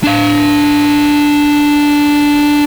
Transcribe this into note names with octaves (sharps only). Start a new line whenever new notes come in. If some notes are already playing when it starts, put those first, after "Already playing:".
D4 F5